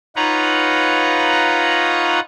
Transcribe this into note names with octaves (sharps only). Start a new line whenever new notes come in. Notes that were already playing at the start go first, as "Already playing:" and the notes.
D#4 F4 B4 C#5 F#5 A#5